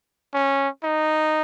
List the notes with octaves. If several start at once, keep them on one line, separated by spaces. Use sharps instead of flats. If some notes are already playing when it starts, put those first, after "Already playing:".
C#4
D#4